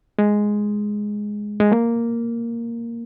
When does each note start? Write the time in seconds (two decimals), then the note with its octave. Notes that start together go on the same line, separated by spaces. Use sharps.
0.19 G#3
1.60 G#3
1.72 A#3